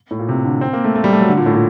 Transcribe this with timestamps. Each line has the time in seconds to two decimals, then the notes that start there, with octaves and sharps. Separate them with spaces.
0.11 A2
0.19 A#2
0.29 C3
0.45 D3
0.61 C4
0.73 A#3
0.84 A3
0.95 A3
1.04 G3
1.13 A3
1.21 F#3
1.29 D3
1.37 A#2
1.46 A2
1.54 A#2